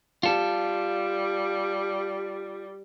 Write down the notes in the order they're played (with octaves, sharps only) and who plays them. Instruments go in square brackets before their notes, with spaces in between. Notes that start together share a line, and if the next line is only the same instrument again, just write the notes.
[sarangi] G3 [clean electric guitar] F4 A4